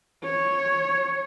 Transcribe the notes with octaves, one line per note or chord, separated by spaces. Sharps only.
C#5